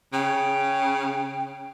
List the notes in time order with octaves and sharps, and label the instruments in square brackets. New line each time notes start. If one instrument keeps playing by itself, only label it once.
[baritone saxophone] C#3 [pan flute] G5